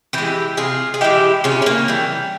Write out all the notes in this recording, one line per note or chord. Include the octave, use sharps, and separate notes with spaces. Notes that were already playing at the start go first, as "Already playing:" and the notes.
E3 G#3 E4 G4
C3 F4 G#4
G#4
E3 G#3 E4 G4
C#3 C#4 F4
E4
A#3 C#4
E3 G3